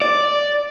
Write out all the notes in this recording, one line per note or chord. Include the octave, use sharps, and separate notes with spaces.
D5